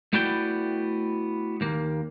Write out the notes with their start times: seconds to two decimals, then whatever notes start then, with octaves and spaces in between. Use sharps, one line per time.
0.13 A3 B3 E4 F#4 D5 G5
1.61 D#2 A#3